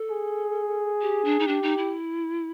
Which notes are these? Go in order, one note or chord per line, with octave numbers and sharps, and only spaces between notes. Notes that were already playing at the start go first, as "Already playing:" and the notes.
Already playing: A4
G#4
G4
D4
D#4
D4 G4
D#4
E4